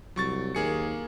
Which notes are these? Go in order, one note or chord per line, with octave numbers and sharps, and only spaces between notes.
C2 F#3 C#6 A6
D#2 A#3 G#4 C#7